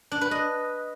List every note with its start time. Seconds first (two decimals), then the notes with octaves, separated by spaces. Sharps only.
0.12 D4
0.21 B4
0.31 D#5